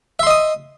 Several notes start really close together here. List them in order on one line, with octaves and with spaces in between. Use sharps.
E5 C6 D#5 D#6